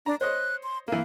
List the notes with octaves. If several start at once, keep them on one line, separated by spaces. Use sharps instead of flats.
D4 A#5
C5 C#5 D#5 F#6
C6
E3 A#3 F5